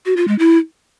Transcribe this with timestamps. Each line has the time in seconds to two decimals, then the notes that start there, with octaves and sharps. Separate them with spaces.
0.06 F#4
0.17 F4
0.28 G#3
0.39 E4